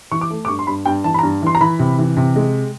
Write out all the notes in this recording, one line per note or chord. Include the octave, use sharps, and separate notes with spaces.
E3 C#6
D6
A3
D6
G2 C#6
C6
G2 B5
G2 G5
E3 A5
B5
A#5
G2
E3 C6
A#5
E3 B5
C3
E3
C3
G#3